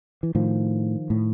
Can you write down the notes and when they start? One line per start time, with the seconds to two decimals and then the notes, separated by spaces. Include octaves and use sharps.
0.23 E3
0.35 A2 D#3 F3
1.10 A2